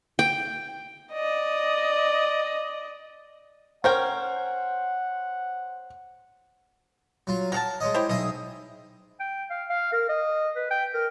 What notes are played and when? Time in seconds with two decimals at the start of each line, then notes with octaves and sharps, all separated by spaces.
0.19 G5
1.13 D5 D#5
3.84 C#4 A#4 C5 F#5 G5
7.27 F#3 F4
7.52 F#3 G#4 A#4 A5
7.80 G#3 C#5 D#5
7.94 E4 G4 C5
8.09 B1 G#4 D#5 E5
9.20 G5
9.50 F5
9.70 F5
9.93 A#4
10.09 D#5
10.56 B4
10.71 G5
10.94 A#4